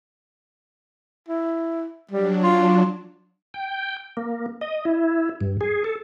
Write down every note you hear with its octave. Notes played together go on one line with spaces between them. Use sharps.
E4
F#3 G3 D4
F4
G5
A#3
D#5
E4
G2
G#4
A4